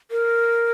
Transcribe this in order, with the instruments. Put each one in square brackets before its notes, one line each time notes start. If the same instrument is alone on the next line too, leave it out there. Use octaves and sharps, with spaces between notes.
[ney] A#4